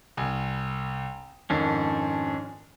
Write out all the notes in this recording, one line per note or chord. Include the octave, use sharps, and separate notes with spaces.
C2 G#5
F2 G#2 D#3 C#4 D4